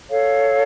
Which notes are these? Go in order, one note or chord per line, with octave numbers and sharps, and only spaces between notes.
A4 C#5 F5